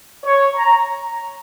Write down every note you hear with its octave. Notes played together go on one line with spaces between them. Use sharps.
C#5
A#5